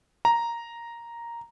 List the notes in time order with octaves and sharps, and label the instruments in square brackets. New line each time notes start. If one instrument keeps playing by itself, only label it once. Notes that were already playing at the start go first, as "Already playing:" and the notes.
[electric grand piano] A#5